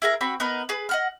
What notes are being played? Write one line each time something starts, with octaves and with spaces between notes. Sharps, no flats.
E4 G#4 A#4 A#5
C4 F#4 B5
B3 D#4 A#4 B4
G#4 B4
D#5 F#5 F6